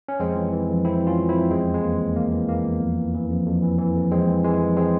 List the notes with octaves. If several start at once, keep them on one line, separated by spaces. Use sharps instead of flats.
C#4
F2 G#3 C4
E3
E3
F2
F2 C4 E4
E3 C#4 F4
E3
C4 E4
F2
E2 G#3 C4
E3
G#3
E3 A#3
E2
E2 A#3
E3
E3 A#3
E2
F2
E3
E3
F2
F2
E3
E3
F2
F2 G#3 C4
E3
E3 G#3
F2
G#3 C4